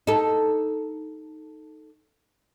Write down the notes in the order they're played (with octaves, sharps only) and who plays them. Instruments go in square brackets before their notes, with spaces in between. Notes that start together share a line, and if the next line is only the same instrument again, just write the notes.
[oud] D#4 A4